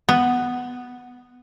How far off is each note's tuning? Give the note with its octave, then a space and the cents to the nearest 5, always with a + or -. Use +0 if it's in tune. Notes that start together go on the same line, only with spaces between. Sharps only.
B3 +0